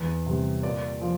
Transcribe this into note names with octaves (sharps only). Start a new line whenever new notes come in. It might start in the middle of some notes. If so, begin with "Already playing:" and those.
Already playing: E2
C3 G3
A#2 D5
F3